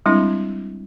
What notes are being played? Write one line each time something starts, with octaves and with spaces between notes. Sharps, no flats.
G3 G#3 C4 D4 E4